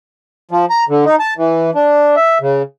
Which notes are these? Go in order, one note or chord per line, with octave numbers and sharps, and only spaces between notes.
F3
A#5
D3
D#4
A5
E3
D4
E5
C#3